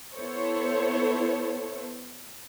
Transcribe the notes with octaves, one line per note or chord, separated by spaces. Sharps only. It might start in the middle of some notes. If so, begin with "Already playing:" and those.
B3 E4 A4 C5 C#5